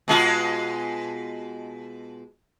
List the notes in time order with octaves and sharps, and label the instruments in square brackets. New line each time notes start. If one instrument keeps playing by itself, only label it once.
[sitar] B2 G#3 F4